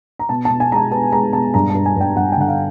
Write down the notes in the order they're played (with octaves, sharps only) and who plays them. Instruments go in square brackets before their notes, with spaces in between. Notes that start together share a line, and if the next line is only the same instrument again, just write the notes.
[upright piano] A#5
B2 A5
B2 A5
G#5
G#3 A#5
A5
B3 A5
G#3 A#5
B2 A5
G2 A#5
A5
G2
G#5
G2 G5
G2 F#5
G5
D3 F#5
F5